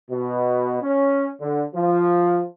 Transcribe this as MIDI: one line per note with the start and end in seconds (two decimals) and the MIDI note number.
0.10 0.77 47
0.82 1.30 61
1.41 1.64 50
1.74 2.44 53